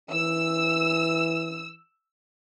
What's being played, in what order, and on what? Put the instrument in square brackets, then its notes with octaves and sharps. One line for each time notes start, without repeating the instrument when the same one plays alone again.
[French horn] E3 [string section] E6